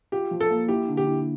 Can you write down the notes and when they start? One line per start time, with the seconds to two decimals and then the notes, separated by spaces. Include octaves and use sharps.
0.12 F4 G4
0.31 F3
0.41 A4
0.50 A#3
0.68 E4 G4
0.88 D3
0.97 G4
1.06 E4